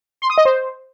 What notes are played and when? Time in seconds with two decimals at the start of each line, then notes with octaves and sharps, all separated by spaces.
0.22 C6
0.30 D#6
0.38 D#5
0.45 C5